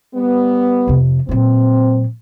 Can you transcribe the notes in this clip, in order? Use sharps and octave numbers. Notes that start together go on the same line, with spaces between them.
G3 B3
F2 C3
A#2 F#3 C4